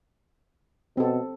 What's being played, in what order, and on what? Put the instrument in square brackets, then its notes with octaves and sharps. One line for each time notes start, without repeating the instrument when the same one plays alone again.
[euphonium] B2 [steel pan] C4 A4